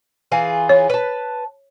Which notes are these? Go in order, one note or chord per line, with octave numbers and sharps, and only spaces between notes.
E3 F4 G#4
C#5
B4 A5